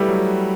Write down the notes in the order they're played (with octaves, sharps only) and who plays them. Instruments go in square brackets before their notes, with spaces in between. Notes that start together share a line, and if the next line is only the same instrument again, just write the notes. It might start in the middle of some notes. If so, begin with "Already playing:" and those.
Already playing: [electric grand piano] G3 [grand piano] A3 E4 G4 B4
[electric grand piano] F#3